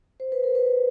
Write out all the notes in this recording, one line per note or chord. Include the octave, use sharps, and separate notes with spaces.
C5
B4
A#4
B4